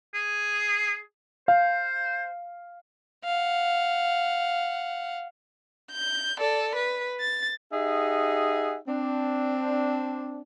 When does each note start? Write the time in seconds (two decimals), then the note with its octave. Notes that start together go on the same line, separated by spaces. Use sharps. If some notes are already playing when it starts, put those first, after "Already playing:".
0.14 G#4
1.48 C5 F5
3.25 F5 F#5
5.92 G6
6.39 A4 D5
6.76 B4
7.20 A6
7.71 D#4 G4 G#4 E5 F#5
8.87 C4 D4